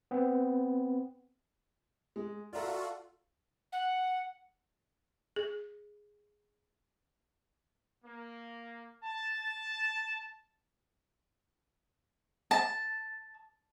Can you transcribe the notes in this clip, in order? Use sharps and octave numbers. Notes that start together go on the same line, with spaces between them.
B3 C4
G#3
F4 F#4 A4 D5 E5 A#5
F#5
G#4
A#3
A5
A5